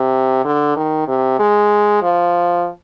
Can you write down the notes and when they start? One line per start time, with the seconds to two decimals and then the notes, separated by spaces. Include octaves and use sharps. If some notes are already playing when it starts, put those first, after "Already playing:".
Already playing: C3
0.45 D3
0.76 D#3
1.08 C3
1.39 G#3
2.02 F3